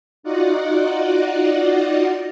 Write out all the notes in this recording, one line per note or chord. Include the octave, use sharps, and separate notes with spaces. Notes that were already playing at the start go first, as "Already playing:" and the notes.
D#4 F4 F#4 D5 D#5 F#5